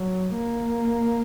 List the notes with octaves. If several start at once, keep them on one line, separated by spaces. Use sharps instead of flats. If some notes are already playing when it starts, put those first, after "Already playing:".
Already playing: F#3
A#3